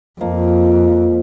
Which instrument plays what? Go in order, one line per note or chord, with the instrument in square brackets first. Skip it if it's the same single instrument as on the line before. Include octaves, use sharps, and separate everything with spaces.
[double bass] F2 [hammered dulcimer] F3 A#3 D#5